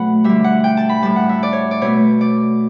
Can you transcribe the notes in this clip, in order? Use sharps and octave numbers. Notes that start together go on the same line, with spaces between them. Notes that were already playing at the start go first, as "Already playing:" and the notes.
Already playing: B2 F#3 A3 F#5 A5 B5
D3 G3 E5
F#5
G5
A5
B5
A2 G3 A5
F#5
E5
D5
C#5
D5
B2 A3 C#5
D5